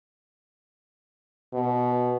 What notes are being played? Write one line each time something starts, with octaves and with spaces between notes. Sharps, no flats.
B2